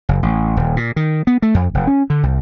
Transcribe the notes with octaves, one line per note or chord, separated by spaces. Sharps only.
F#1
A1
D#1
A#2
D#3
B3
A3
F2
F1
C#4
D3
C2